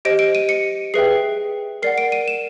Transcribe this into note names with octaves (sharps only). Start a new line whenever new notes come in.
G4 C5 D#5 D7
D7
D#7
C#7
G#4 B4 E5 G5 C7
A#4 D5 F#5 C7
D7
D#7
E7